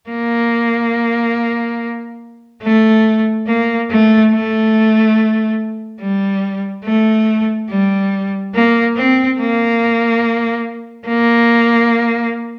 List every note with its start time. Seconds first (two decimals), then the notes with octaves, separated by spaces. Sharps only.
0.09 A#3
2.62 A3
3.47 A#3
3.90 A3
4.32 A3
6.00 G3
6.85 A3
7.70 G3
8.55 A#3
8.96 C4
9.39 A#3
11.07 A#3